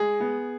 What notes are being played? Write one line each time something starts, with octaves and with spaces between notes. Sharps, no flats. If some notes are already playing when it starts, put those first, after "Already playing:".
Already playing: G#3 G#4
B3